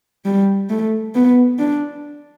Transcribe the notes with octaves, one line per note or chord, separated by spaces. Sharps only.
G3
A3
B3
D4